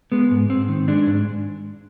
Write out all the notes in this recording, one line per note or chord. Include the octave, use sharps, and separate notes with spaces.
G#3 B3
G#2
G#2 C4
D#3
G#3 D4
G#2